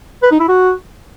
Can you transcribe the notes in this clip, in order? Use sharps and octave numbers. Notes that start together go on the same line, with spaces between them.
B4
D#4
E4
F#4